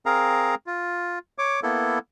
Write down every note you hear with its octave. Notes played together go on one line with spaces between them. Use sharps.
C4 G#4 A#4 F5 A#5
F4
C#5 D6
A#3 B3 E4 A4